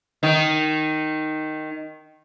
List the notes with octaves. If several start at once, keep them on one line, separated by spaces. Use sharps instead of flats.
D#3 D#4